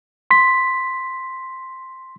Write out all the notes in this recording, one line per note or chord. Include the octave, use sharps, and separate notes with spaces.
C6 B6